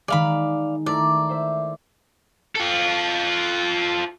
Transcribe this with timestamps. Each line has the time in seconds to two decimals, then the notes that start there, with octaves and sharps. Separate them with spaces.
0.08 D#3 G#3 D5 F5 B5
0.86 A3 E4 A#4 D5
1.29 C5 E5
2.55 F4 A4